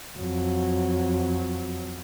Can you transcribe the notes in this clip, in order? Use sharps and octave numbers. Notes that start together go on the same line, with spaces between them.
F2 F#3